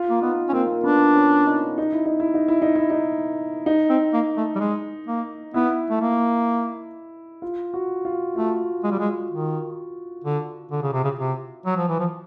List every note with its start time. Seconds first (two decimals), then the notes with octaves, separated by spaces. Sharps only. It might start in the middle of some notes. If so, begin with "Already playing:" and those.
Already playing: F4
0.10 A#3
0.22 B3 D#4
0.49 C#4
0.53 A#3 C4
0.67 A#3
0.84 B3 D4
1.15 C#4
1.46 D#4
1.78 D#4
1.92 E4
2.06 D#4
2.20 E4
2.34 D#4
2.48 E4
2.62 D#4
2.76 E4
2.90 D#4
3.66 D#4
3.89 C4
4.13 A#3
4.37 A3
4.55 G3
4.60 G#3
5.07 A#3
5.54 B3 E4
5.90 A3
6.01 A#3
7.42 F4
7.74 F#4
8.05 F4
8.36 A3 F4
8.84 G#3
8.91 G3
8.99 G#3
9.30 D#3
10.24 D3
10.71 D3
10.82 C#3
10.93 C3
11.04 C#3
11.19 C3
11.66 F#3
11.77 F3
11.88 E3
12.00 F3